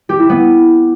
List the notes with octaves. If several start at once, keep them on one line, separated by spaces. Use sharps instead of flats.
G4
E4
B3